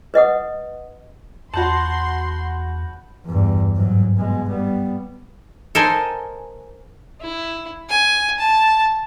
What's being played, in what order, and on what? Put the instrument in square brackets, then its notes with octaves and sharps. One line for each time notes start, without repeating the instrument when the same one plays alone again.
[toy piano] B4 D#5 F#5 D#6
[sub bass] E2 [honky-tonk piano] F#4 A5 [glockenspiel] B5 G6 F#7 [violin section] C6
[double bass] E2 G2
G#2 F#3
B2 G#3
G3 B3
[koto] A4 A#4 C5 D#5 G#5
[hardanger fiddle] E4
G#5
A5